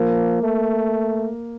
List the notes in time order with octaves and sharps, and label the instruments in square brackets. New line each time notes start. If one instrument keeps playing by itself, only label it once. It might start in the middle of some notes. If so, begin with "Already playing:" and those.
Already playing: [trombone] F3 [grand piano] A#3
[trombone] A3